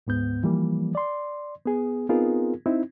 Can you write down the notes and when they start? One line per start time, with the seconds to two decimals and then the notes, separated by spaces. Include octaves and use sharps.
0.07 D2 G#2 B3 G6
0.44 E3 F3 G3 A#3
0.95 D5 C6
1.66 B3 G#4
2.09 B3 C4 D#4 F4 G#4 A#4
2.66 C4 D#4 E4